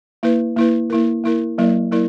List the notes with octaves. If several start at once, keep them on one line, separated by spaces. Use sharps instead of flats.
A#3 E4 B4
A#3 E4 B4
A#3 E4 A#4
A#3 E4 A#4
F#3 A#3 E4 A#4 D5
F#3 A#3 E4 A#4 D5